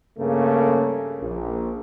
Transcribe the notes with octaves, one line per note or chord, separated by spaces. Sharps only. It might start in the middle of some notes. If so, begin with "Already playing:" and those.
G2 C#3 A3 A#3
A#1